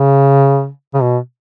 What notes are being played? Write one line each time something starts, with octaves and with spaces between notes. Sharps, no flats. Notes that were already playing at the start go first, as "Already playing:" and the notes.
Already playing: C#3
C#3
B2